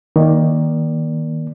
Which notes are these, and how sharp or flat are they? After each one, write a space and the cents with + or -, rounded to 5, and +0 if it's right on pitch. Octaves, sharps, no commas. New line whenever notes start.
D#3 +15 A#3 +20 D5 +0